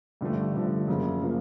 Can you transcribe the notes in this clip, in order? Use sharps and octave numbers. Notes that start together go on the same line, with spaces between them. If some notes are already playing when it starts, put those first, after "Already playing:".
G2 D3 F3 A3
G2 D3 F3 A3
F#2 C#3 F3 A#3
C#3 F3 A#3